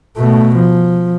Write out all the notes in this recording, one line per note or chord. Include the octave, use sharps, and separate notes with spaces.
B2 A3
F3